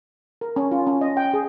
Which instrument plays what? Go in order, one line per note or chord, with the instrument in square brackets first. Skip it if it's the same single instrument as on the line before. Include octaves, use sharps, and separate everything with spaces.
[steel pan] A#4
C#4
F4
C#4
D#5
G5
G#4